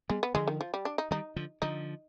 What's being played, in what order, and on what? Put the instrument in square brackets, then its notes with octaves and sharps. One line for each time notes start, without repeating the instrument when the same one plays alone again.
[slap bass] G3 B3 [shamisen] G#3
[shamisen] B3
[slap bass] D3 F3 [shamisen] G#3
[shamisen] D#3
F3
G3
D4
D#4
[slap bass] D#3 G3 [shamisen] D#4
[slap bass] D3 F3
[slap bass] D3 F3 [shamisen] D#4